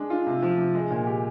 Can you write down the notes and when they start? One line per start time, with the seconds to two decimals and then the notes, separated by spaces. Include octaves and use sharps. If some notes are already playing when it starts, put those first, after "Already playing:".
Already playing: G#3 D4
0.10 F4
0.27 C3
0.43 F3
0.58 C3
0.74 G#3
0.90 A#2
1.07 G4